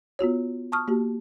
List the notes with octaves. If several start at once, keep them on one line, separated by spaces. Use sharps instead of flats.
B3 F4 F#4 C#5
A5 C#6 D#6 F6
A#3 F#4 G4